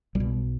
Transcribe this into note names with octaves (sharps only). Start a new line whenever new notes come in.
B1 G3
B2